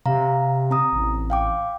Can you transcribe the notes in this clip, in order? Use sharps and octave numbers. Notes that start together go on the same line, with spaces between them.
C3 F5 A#5
C4 A#5 D#6
A1
F5 G5 D6